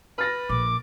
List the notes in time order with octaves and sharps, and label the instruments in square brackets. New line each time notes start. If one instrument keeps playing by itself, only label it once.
[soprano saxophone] B4 [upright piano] F6 A6 A#6
[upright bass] A#1 [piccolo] D6